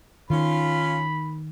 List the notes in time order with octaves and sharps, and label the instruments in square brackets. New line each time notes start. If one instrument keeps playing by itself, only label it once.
[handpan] D#3 D#4 [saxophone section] C#4 F4 [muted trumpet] B5